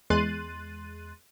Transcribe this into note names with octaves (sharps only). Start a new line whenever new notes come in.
E2 G#3 C6 F#6 A6 D#7